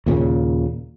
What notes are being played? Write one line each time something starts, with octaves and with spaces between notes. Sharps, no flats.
D#2 A#2 C#3